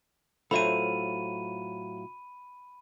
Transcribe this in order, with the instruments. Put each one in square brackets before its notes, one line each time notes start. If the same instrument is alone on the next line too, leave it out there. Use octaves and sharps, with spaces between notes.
[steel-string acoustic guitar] A2 F#3 F4 [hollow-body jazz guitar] A4 C5 E5 [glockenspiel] B5 D#7